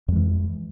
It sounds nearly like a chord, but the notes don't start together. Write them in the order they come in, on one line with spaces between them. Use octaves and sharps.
F2 G#3 E3